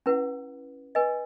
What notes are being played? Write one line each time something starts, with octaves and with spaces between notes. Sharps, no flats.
C#4 E4 B4 F#5
B4 D#5 G#5